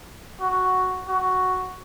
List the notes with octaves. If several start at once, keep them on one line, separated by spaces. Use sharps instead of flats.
F#4
F#4